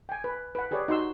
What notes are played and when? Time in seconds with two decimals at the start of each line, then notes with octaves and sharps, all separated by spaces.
0.09 G5 G#5
0.24 B4
0.55 B4 F#5
0.71 G4 G#4 B4 C#5 D5
0.88 D#4 F#4 C6 E6